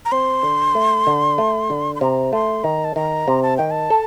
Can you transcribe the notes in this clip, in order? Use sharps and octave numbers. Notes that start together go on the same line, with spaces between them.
A#5
C4 C6
D3
A3
D3
A3
D3
C6
C3 A#5
A3 C6
D#3 A#5
A5
D#3 A#5
C3
A5
D#3 G5
A5
A4